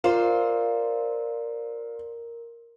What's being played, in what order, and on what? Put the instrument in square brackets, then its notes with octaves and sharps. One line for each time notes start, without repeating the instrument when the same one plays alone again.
[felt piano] F4 [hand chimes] A#4 [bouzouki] C5 D5 F5